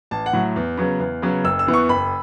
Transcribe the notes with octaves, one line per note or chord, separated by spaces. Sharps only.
A1 A5
F#5
A2 F#3
E2
C#3 F#3 B3
E2
C#3 F#3 B3
F#1 E6
E6
E2 E3 B3
C#6
F#1 B5